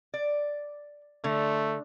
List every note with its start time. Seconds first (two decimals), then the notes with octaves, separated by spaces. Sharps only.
0.14 D5
1.24 D3 A3